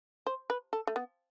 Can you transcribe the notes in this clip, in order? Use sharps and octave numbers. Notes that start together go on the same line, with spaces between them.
C5
B4
A4
A3
B3